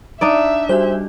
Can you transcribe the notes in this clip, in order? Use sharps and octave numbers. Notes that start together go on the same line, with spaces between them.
D4 D#4 D5 E5
G3 F#4 G4 C5